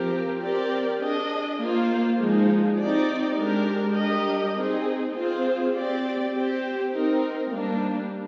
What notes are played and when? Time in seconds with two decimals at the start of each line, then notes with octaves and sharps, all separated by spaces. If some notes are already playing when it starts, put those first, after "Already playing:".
Already playing: F3 C4 G4 A#4
0.41 C4 G4 A#4 D5
1.00 D4 G#4 D#5
1.60 A#3 F4 C5
2.19 F3 G#3 D#4 G#4
2.79 C4 D#4 G4 D5
3.37 G#3 D4 G4 A#4
3.97 G3 D4 G4 A#4 D#5
4.56 C4 D#4 G#4
5.15 C4 F4 G#4 C5
5.75 C4 G4 D5
6.34 C4 G4 C5
6.93 C4 D#4 A#4
7.52 G3 A#3 D4